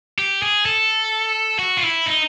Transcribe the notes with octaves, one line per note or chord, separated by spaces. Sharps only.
G4
G#4
A4
F#4
F4
E4
D#4